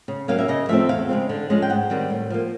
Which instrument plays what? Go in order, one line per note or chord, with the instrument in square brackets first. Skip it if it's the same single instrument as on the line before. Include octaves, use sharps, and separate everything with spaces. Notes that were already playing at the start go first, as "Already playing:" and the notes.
[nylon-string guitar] C#3
F#3 A#3 C#4 F5
E5
C#3 D#5
F3 A3 C4 E5
E2 F5
C#3 F3 G#3 C4
D3
F3 G#3 C#4
G5
G#2 F#5
D#3 G3 C4
A2
F3 A#3